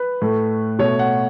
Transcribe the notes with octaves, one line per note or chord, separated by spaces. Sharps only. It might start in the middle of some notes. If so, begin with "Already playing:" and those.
Already playing: B4
A2 A3
B2 A3 C#5
F#5